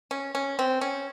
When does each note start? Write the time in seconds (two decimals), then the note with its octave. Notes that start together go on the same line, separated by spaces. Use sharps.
0.11 C#4
0.35 C#4
0.59 C4
0.81 C#4